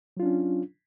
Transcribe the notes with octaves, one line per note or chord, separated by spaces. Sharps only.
F#3 C#4 D4 F4